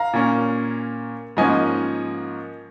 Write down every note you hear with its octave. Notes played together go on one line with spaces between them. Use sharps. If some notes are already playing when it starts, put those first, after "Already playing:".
Already playing: F5 A#5
A#2 A#3 C#4
G#2 F3 A#3 C#4 D#5 G#5